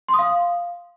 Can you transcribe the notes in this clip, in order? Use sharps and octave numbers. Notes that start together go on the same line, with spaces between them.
C6
D#6
F5